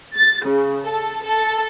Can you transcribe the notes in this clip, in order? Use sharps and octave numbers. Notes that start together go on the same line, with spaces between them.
A6
C#3
A4
A4